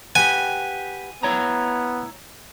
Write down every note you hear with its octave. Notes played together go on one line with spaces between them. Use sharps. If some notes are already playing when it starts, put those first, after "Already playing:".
G4 B4 F#5 G#5
B3 E4 C#5 A#5